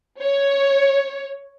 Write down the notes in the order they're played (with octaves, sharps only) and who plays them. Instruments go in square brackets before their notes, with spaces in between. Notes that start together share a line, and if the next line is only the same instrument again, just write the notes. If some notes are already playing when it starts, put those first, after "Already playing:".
[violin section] C#5